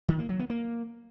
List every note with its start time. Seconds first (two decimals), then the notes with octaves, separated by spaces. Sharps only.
0.08 D#3
0.19 A#3
0.29 F#3
0.39 B3
0.50 A#3